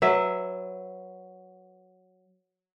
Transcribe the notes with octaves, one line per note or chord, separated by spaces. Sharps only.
F#3 B4 E5